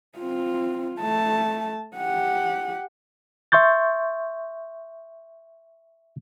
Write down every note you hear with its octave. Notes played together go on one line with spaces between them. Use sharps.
C4 F4
A3 A5
G4 F#5
E5 C6 C#6 G6 A6